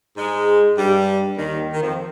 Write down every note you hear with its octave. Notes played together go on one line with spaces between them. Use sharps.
G#2 G#3
G2 G3
D#2 D#3
D#3
F2 F3